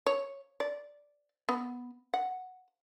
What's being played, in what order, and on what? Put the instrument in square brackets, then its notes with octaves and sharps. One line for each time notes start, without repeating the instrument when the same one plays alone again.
[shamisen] C#5
D5
B3
F#5